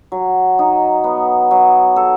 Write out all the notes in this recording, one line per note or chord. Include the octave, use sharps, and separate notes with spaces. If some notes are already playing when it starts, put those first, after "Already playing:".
F#3
D#4
B3
F#3
A4